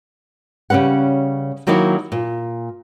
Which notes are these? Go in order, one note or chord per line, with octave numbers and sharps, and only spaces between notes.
C#3 G3 C#4 B4 F#5
D#3 F#3 A#3 D#4 E4 F#4
A#2